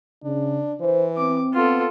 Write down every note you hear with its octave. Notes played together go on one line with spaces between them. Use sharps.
C#3 D4
E3 C5
C4 D6
B3 F4 A4